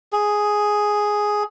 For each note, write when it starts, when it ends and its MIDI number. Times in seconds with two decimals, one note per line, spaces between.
0.13 1.43 68